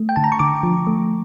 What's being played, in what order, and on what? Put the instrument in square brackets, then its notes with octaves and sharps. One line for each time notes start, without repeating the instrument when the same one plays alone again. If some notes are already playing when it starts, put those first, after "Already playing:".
Already playing: [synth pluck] A3
G5
D3 A5
A#5
C#6
D3 D6
F3
A3